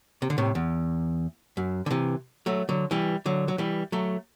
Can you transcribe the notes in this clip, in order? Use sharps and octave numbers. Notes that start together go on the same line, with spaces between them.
C3
D3
A2 C3
E2
F#2
D3
C3 E3
F#3 A3
D3 F#3
E3 G3
D3 F#3
F#3
E3 G3
F#3 A3